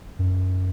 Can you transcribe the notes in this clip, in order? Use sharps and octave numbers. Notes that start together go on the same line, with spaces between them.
F#2